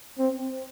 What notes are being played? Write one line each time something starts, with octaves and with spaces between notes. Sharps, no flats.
C4